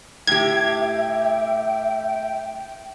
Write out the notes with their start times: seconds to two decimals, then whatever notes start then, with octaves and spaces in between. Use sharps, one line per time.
0.27 A2 G4 E5 G5 G#6